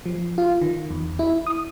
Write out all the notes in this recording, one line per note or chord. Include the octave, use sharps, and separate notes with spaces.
F3
F4
D#3
E2
E4
D#6